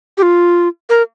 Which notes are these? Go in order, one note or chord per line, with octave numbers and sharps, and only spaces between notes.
G4
F4
A#4